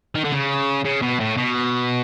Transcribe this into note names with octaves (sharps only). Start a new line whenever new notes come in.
D#3
D3
C#3
C#3
B2
A2
B2